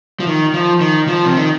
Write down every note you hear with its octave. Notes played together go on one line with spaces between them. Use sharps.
F3
D#3
F3
D#3
F3
C3
D#3